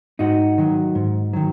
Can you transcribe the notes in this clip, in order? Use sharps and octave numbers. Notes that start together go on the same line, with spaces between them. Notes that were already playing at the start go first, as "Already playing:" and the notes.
G#2 D#4 F#4
D#3 F#3
G#2
D#3 F#3